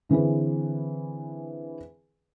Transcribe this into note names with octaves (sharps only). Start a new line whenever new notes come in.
D3 E3 C4 G#4 B4